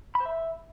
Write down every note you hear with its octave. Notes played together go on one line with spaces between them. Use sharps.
B5
C5
E5